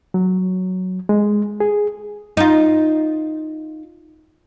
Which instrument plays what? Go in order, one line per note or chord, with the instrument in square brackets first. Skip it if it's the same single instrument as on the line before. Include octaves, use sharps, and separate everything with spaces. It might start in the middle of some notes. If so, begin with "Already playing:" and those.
[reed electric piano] F#3
G#3
G#4
[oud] D#4 F4